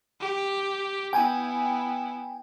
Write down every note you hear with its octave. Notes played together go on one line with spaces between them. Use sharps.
G4
B3 E4 G5 G#5